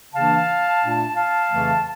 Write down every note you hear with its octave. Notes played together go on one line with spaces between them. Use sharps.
C#3 E3 A#3 D4 F5 A5
A#2 A3 D4
F5 A5
F2 C#3 E3 A3